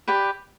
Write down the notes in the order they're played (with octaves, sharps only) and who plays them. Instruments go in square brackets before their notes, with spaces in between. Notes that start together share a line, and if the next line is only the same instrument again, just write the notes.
[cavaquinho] G4 B4 D5